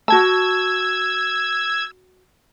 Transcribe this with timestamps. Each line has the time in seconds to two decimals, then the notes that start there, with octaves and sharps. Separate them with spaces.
0.08 F#4 A5 E6 G#6